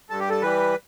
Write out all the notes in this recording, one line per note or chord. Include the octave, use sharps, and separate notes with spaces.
G2 A4
G4
A4
E3 G3 B4